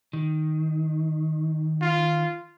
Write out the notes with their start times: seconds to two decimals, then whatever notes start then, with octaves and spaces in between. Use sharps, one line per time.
0.13 D#3
1.82 F4